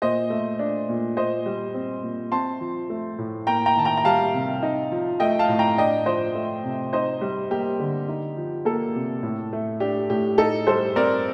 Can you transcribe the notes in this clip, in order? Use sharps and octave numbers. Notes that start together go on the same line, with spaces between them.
A#2 C5 D#5
A3
D4
A#2
A#2 C5 D#5
G3
C4
A#2
C4 A5 C6
F3
A3
A2
A#3 G5 A#5
G5 A#5
D#3 A5
G5 A#5
A#5
G3 F5 A5
C3
D#4
F3
A3 D#5 G5
F5 A5
A2
G5 A#5
D4 D#5 G5
F3 C5 D#5
A3
C3
D#4 C5 D#5
G3
A#3 G4
D3
D#4
F3
A#3 A4
C3
A2
A3
D4 G4
A2 G4
D#4 A4
G3 A4 C5
C4 A#4 D5